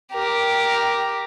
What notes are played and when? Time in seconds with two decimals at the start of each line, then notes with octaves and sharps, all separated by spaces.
0.13 G4 A#4